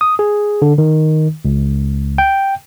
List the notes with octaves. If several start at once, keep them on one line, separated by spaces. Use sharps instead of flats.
D#6
G#4
D3
D#3
C#2
G5